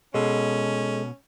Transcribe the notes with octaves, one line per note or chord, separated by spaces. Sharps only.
B2 G#3 C#4 A4